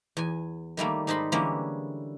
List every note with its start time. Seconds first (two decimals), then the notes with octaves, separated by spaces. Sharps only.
0.17 E2 G#5
0.77 D#3 G3 A3 A#3
1.07 G#2 G3 D#4 A5 B5 C6
1.32 D3 E3 G3 G#3 A#3 C#4